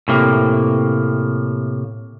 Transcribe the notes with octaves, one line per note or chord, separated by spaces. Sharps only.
A2 C3 A#3